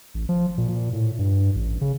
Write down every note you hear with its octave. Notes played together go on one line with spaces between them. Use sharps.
A1
F3
A#2
A#2
A2
G2
A1
C#3